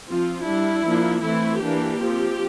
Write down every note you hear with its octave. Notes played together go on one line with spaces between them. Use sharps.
F3 C4 F4
G3 D4 E4
F3 A#3 D4
E3 A3 C4 E4
E3 A#3 D4 G4
F3 C4